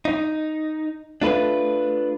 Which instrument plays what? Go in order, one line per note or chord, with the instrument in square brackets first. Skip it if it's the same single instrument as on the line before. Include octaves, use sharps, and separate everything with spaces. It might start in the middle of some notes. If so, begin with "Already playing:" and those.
[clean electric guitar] D#4
[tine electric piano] A3 A4 [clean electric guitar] D4 F4 B4